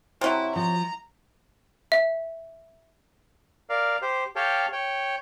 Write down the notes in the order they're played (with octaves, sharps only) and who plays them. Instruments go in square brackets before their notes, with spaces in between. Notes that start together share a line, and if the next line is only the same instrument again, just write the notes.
[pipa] C3 F#3 [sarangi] E4
[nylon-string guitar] F3 [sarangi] A#5
[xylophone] E5
[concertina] A#4 D5 F5
G4 C5
G4 A4 C#5 F5 G5
C#5 G5